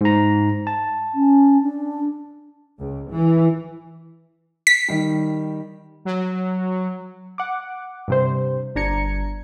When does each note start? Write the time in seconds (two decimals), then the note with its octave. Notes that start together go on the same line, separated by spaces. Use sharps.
0.01 G#2 A#5
0.67 A5
1.14 C#4
1.62 D4
2.79 C#2
3.11 E3
4.67 B6
4.88 D#3 G3
6.05 F#3
7.38 F#5 D6
8.08 G2 C3 C5
8.75 G1 D4 A#5 G#6 C#7